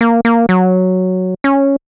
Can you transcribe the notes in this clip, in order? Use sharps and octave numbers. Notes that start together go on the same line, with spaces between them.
A#3
A#3
F#3
C#4